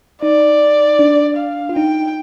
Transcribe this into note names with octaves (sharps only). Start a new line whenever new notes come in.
D#4 D5
D4
F5
F4
D#4 G5